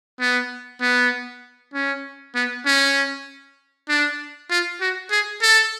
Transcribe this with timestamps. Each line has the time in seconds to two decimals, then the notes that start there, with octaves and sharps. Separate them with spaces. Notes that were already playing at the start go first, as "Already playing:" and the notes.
0.20 B3
0.81 B3
1.74 C#4
2.35 B3
2.66 C#4
3.89 D4
4.50 F4
4.81 F#4
5.11 G#4
5.42 A4